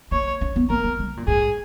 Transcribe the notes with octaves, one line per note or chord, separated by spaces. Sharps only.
A#3 C#5
C#4
B3
A#3 A#4
B3
G#3
C#3
A#2
G#2 G#4